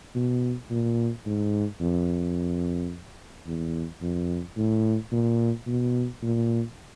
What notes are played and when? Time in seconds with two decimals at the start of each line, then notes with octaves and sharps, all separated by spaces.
0.15 B2
0.70 A#2
1.26 G#2
1.80 F2
3.47 E2
4.01 F2
4.57 A2
5.12 A#2
5.67 B2
6.22 A#2